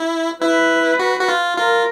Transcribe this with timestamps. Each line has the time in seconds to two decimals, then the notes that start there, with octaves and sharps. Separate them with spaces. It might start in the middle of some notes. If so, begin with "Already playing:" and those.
Already playing: E4
0.42 E4 B4
0.99 F#4
1.20 F#4
1.29 F4
1.57 F4 A#4